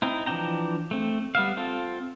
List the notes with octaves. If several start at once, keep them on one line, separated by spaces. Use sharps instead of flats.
C4 D#4 E4
E3 F3 D4 G5 A#5
A3 C4
G3 B3 E5 F5
C4 F4 A4